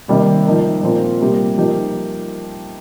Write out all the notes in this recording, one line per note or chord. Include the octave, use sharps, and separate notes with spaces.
C3 D#3 G3 A#3
F3 D#4 A#4
A#2 F3 C4 F4 A#4
C3 G3 A#3 G4
F3 D#4 G4 A#4